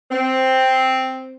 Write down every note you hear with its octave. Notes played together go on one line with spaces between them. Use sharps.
C4